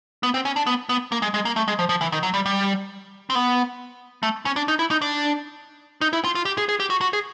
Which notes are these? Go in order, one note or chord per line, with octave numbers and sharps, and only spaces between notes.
B3
C4
C#4
D4
B3
B3
A#3
G#3
G#3
A#3
A3
G#3
F3
F3
E3
D#3
F#3
G3
G3
C4
B3
A3
C#4
D4
D#4
E4
D#4
D4
D#4
E4
F4
F4
G4
G#4
G#4
G4
F#4
F#4
G#4